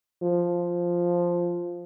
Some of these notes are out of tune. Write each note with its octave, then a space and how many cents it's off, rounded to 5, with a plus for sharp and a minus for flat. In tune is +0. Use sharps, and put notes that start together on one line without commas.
F3 +0